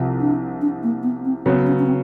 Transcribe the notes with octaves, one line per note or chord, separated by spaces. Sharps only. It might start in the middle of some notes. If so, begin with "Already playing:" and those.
Already playing: C2 C3 F3
D4
D4
A#3
B3
C4
C#3 F#3 B3 C4
C#4
C#4
C4